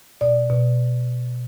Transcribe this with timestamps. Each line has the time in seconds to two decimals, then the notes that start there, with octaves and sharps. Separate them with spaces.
0.21 B2 D5
0.50 B2